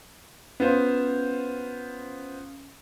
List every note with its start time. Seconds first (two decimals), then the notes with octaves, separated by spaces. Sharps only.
0.60 B3 C#4 F4 C5